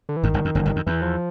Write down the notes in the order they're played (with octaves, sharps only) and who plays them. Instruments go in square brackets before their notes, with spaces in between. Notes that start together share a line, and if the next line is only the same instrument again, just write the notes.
[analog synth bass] D3
E3
[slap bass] G#1 G#2 [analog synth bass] D#3
[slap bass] G1 G2
F2
F#1 F#2
G1 G2
F2
[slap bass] E2 [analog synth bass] E3
[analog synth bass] F3